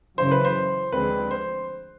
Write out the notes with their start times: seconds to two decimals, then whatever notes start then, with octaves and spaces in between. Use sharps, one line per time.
0.18 F#2 C#3 E3 C5
0.31 B4
0.45 C5
0.92 D2 D3 F3 G#3 C4 B4
1.31 C5